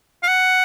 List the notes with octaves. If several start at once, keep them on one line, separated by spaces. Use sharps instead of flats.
F5
F#5